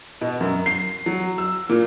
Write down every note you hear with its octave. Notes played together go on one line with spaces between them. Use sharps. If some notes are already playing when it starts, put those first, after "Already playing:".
B2
F#2
C7
F#3
E6
A#2